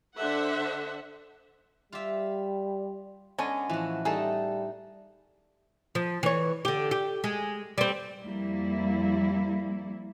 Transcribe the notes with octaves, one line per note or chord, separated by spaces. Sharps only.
D3 D4 A4 C5 E5 F#5
G3 F4 G4 E5
D3 G#3 B3 C#4 A4 D#5 G#5
A2 E3 F3 F#4
G3 A3 D#4 G#4 A4
F3
E3 C#5
D3 G4
G4
G#3
G3 C4
F2 G3 A#3 E4